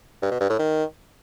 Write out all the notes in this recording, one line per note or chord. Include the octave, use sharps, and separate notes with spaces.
G2
B2
G2
A2
D#3